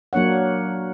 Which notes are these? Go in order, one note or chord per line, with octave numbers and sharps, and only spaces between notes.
F#3 A#3 D4 C#5 F#5